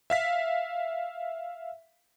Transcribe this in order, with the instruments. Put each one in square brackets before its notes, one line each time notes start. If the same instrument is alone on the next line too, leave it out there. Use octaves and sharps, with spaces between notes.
[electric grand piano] E5 F5 B6